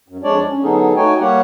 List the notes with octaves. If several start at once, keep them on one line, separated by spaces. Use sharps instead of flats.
F#2
F2 G#3 D4 C#5 D5
C#4
D3 F#3 B3 D#4 G#4 A4
A3 D#4 F#4 C#5 G5 G#5
G3 A#3 G4 C#5 F#5